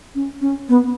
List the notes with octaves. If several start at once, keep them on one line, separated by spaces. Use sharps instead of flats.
C#4
C#4
B3